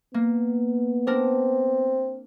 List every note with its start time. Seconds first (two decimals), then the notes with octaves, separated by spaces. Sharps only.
0.14 A#3 B3
1.07 C4 D4 A#4